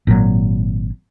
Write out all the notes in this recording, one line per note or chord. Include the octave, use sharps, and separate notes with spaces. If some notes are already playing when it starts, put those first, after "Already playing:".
G#1 A#2 D#3 F#3